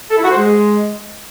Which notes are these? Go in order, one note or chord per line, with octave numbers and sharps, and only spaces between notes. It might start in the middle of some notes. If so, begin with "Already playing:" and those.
A4
E4
F#4
C5
G#3